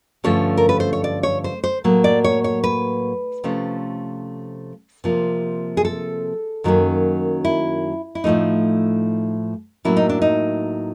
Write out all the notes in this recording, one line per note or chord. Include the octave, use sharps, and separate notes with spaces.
G2 D3 F3 A3 C#4 C#5
A#4
B4
C5
C#5
D5
C#5
C5
C5
A2 F#3 A#3
D5
C#5
C#5
B4
C3 F3 A3 C#4
C3 F3 A#3
G#4
A4
F#2 D#3 F#3 A#3 C#4
E4
E4
A2 F3 A3 D#4
A2 F#3 A#3 C#4 E4
D#4
D4
D#4